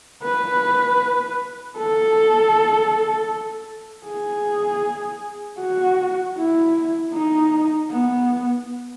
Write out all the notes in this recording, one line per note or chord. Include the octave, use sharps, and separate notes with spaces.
B4
A4
G#4
F#4
E4
D#4
B3